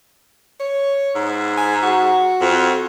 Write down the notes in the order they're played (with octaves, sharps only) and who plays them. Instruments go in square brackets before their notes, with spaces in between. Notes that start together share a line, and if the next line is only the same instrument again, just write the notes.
[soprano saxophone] C#5
[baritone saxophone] G#2
[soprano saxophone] G#5
F#4
[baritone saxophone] F2